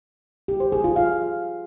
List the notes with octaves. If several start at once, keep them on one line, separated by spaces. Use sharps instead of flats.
G4
C5
G#4
F4
F5